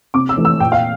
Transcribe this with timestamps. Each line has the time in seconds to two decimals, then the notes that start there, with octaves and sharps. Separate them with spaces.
0.14 C3 D6
0.29 E6
0.37 E3 A3
0.45 E6
0.60 A#2 G5
0.72 F5